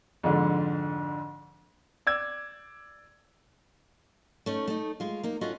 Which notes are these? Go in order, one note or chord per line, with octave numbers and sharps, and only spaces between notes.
F2 G#2 D3
D5 E6 G#6
A3 C#4 D#4
A3 D#4
G#3 F4
A#3 D#4
C#4 F4 F#4 A4 D#5 E5